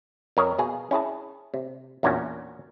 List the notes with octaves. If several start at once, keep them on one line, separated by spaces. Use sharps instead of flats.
F2 A#4 C#5 D#5
B2 G#4 F5
C#4 E4 G#4 A5
C3
E2 A#2 C#4 D4 F#4